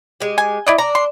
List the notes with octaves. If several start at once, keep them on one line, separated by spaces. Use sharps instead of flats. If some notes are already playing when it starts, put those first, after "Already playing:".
G#3 G4
G#5
E4 D5 D#5
D4 A#5
C6